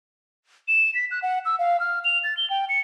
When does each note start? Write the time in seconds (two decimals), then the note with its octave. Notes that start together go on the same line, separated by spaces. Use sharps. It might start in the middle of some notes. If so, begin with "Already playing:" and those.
0.68 E7
0.95 B6
1.11 F#6
1.22 F#5
1.45 E6
1.59 F5
1.80 F6
2.05 F7
2.24 A6
2.37 G7
2.50 G5
2.69 C#7